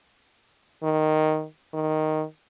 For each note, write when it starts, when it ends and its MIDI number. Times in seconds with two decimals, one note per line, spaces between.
0.84 1.45 51
1.74 2.24 51